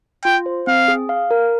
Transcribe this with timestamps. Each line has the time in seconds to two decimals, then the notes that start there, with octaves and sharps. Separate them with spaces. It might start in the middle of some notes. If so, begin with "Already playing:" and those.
0.24 F4 G5
0.46 C5
0.67 C4 F5
0.88 G#4
1.09 F5
1.31 A#4